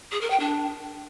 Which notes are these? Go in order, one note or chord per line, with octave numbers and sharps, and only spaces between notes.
G#4
A#4
G5
D4